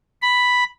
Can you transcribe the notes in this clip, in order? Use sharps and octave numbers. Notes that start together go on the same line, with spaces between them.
B5